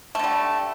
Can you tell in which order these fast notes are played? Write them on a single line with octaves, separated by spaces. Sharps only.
A3 D3 G3